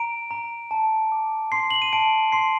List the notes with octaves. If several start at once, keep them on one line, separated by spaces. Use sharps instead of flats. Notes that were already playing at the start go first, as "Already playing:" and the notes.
Already playing: A#5 D7
A#5
A5
D6
C6 C7
F#7
D#7
A5 D7
C6 C7